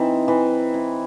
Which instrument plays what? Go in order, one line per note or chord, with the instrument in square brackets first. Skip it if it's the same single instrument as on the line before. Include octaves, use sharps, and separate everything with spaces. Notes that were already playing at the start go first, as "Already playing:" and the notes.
Already playing: [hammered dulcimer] E3 C4 D#4
E3
E4